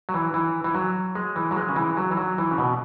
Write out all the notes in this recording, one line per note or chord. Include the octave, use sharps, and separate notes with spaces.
F#3
E3
E3
E3
F#3
G#3
E3
F#3
G#3
C#3
E3
F#3
E3
F#3
E3
C#3
B2